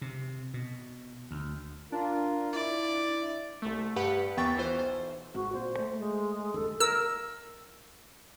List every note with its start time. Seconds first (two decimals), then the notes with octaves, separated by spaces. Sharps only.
0.01 C3
0.54 B2
1.31 D2
1.92 D4 F4 A#4
2.53 E4 D5
3.62 C2 A3
3.96 G2 G4 B4 F#5 B5 C#7
4.37 D#2 E3 B3 G5 C#6 A6
4.58 E3 F4 C5
4.78 B1 C5
5.35 G#1 F#4
5.53 A#2 C5
5.79 A3
5.99 G#3
6.54 F#1 D#2 A4
6.80 A#4 E6